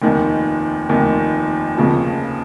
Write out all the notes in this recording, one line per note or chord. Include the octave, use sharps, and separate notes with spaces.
F1 D#2 D#3
F1 D#2 D#3
F1 D#2 C#3 F3